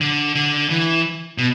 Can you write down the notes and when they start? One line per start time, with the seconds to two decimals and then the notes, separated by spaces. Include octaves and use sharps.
0.01 D3
0.35 D3
0.70 E3
1.38 B2